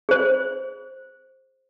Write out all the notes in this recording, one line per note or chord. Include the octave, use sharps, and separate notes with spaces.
G#4 C5